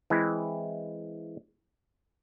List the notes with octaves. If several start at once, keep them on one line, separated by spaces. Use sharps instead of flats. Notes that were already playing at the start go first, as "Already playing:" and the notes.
E3 G#3 C4 E4